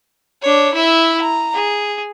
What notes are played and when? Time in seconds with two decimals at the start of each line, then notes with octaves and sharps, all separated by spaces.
0.42 D4 C#5
0.73 E4 E5
1.21 A#5
1.54 G#4